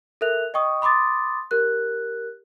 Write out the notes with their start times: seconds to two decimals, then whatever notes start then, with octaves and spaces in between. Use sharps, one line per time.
0.21 A4 A#4 E5 F#6 F7
0.54 D#5 G5 C#6 D#6
0.82 B5 C6 D6 D#6 A6
1.51 G4 A#4 F#6